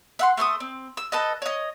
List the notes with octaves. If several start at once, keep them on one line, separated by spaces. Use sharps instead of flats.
E5 F#5 C6
A3 C5 C6 D#6
C4
E6
A4 B4 D#5
C#5 D#5